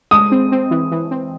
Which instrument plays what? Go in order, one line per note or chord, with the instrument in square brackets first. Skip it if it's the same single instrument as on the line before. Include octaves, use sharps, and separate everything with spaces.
[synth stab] G#3 [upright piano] D#6
[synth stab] C4
C4
E3
E3
C4